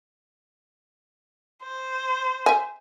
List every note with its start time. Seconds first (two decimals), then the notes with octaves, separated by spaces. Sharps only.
1.64 C5
2.46 E5 G#5